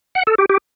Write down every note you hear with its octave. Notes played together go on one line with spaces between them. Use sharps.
F#5
A4
G4
G4